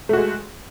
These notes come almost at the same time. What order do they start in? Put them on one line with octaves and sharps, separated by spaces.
A3 F#4 G#3